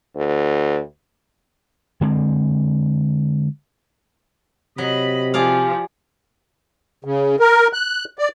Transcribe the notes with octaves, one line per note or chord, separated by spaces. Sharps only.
D2
D3 G#3 C4
C3 F#3 D#5 B5
F3 G4 G#4 D5 F5
C#3
A#4
F#6
D5